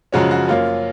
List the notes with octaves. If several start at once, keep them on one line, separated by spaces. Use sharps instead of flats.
F#2 C#3 F3 G#3 C#4 F#4
F#4
F#2 F3 A#3 C#4 F4